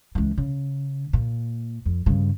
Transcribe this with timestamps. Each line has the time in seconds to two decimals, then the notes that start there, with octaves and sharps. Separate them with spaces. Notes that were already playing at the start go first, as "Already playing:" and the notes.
0.15 C#2 E3
0.38 C#3
1.13 A#2
1.85 F2
2.06 G2 C#3